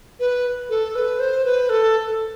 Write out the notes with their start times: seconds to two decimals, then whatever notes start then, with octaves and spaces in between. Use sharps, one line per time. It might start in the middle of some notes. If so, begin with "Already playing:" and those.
0.20 B4
0.70 A4
0.95 B4
1.20 C5
1.45 B4
1.69 A4